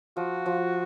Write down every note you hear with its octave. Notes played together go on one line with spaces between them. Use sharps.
F3 F#4
F3